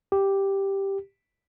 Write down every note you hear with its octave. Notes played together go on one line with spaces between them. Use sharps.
G4